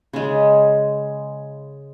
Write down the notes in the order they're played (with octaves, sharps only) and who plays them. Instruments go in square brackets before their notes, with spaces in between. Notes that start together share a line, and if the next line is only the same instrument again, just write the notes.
[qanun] C#3 G#3